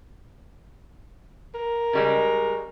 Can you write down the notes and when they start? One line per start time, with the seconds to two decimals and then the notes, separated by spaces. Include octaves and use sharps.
1.55 A#4
1.93 C#3 G3 G#3